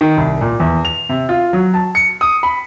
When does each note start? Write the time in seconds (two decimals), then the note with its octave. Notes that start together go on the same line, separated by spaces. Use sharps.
0.01 D#3
0.17 C2
0.41 A#2
0.60 E2
0.85 F7
1.09 C3
1.29 F4
1.53 F#3
1.74 A5
1.95 C#7
2.21 D#6
2.43 B5